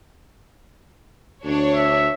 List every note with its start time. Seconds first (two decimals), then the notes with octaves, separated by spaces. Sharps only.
1.44 D2 D4 C#5
1.76 E5